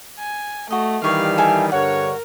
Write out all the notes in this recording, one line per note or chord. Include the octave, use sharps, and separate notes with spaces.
G#5
A3 F#4 D#5
D#3 E3 G3 F5 C#6
A4 E5 G#5
G2 D3 A#4 C#5 F#5